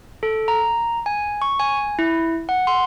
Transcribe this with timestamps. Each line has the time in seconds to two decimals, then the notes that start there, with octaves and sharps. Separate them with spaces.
0.23 A4
0.48 A#5
1.06 G#5
1.42 C#6
1.60 G#5
1.99 E4
2.49 F#5
2.67 C6